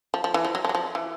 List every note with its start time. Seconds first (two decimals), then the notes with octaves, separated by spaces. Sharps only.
0.14 F3
0.24 F3
0.34 E3
0.45 F3
0.55 F#3
0.65 F3
0.69 F#3
0.75 F3
0.95 E3